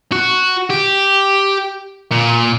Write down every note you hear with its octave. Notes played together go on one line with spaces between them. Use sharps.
F#4
G4
A#2